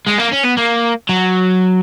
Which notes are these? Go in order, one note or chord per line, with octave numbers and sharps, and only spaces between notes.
G#3
A#3
C#4
B3
A#3
F#3